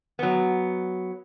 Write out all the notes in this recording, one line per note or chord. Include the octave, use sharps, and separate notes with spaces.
F#3 B3